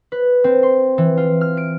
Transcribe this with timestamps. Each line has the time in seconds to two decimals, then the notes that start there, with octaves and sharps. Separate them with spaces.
0.12 B4
0.44 C4
0.63 C6
0.98 E3
1.17 F4
1.41 F6
1.57 D7